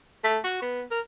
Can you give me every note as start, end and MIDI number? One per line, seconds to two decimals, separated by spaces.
0.24 0.39 57
0.44 0.61 66
0.62 0.82 59
0.91 1.00 70